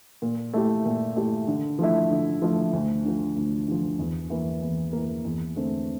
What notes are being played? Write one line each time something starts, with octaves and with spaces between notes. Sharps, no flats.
A#2
A3 E4 G4
A#2
A3 E4 G4
D3
F3 A3 E4
D3
F3 A3 E4
D2
D3 F3
D2
D3 F3
E2
E3 A#3
E2
E3 A#3
E2
D3 A3 C4